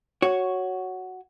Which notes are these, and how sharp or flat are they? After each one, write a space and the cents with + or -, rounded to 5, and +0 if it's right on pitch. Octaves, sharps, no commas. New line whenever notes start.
F#4 +0 C#5 +0